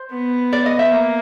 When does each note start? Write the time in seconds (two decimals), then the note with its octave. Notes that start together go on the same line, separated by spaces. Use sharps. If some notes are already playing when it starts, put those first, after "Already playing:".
Already playing: C5
0.12 B3
0.53 D5
0.66 D#5
0.79 E5
0.92 A#3